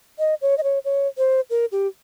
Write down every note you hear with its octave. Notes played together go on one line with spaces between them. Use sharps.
D#5
C#5
D#5
C#5
C#5
C5
A#4
G4